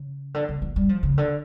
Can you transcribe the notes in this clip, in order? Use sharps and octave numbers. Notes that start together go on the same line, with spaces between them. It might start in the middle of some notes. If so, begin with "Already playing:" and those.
Already playing: C#3
D3
C#3
E3
G3
F3
C#3
D3